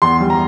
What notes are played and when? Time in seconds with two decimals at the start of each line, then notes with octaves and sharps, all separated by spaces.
0.02 E2 C6
0.21 G3
0.30 A#5